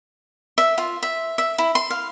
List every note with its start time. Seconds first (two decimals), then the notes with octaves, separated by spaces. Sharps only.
0.58 E5
0.78 F4
1.03 E5
1.38 E5
1.58 E4
1.75 C6
1.90 F5